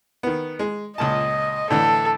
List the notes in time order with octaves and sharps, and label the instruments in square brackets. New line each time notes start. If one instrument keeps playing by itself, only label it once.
[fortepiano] D#3 B3
G#3
[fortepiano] C#2 A#2 A5 [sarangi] D#5
[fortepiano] A2 D3 E3 [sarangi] A4